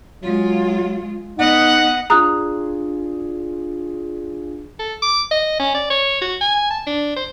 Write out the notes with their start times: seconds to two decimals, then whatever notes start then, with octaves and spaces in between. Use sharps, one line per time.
0.23 F#3 G#3 F4
1.38 B3 D#4 D#5 F#5
2.10 D4 F4 G#4 A#5 D#6 F#6
4.79 A4
5.02 D6
5.31 D#5
5.60 C#4
5.75 D5
5.90 C#5
6.22 F#4
6.41 G#5
6.70 A5
6.87 D4
7.17 C5